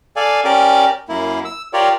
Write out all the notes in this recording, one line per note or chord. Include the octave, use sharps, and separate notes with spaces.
A4 D5 F5 G#5
C#4 G4 A#4 D5 D6
F#2 A#3 E4
E6
F4 G4 A#4 C#5 D5